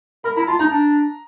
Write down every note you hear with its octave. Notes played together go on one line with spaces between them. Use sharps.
A#4 B5
E4 A#5
F4 A5
D#4 A#5
D4